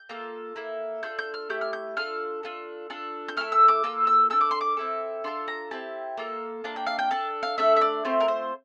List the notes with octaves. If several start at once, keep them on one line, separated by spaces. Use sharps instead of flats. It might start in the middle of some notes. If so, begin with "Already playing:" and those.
Already playing: G6
A#3 F4 A4
A#3 E4 A4
D4 F4 A4 G6
G6
F6
A3 E4 G4 G6
F6
G6
D4 F4 A4 F6
D4 F4 A4
D4 F4 A4
G6
A3 E4 A4 F6
E6
D6
A#3 F4 A4 E6
E6
D4 A4 E6
D6
C6
D6
C4 E4 A4
D4 F4 A4 C6
A#5
C4 E4 G4 A5
A#3 F4 A4
A#3 D4 F4 A5
G5
F5
G5
D4 A4 A5
F5
A3 D4 A4 E5
E5
D5
A3 C4 F4 C5
A#4
C5